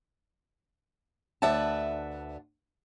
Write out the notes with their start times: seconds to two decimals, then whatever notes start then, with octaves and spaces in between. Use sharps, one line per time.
1.42 D2 B4 D5 E5 F#5 A5